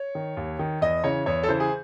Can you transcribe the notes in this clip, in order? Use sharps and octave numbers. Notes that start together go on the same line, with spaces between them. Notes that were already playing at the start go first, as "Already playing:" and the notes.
Already playing: C#5
D#3
D#2
D#3
E2 D#5
C#3 E3 C#5
E2 C#5
A4
C#3 E3 C5
G#4